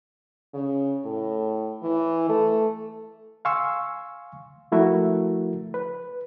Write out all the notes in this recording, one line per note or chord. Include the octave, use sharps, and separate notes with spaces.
C#3
A2
E3
A3
F5 G#5 C6 C#6 E6
F3 A3 E4 F#4 A#4 E5
B4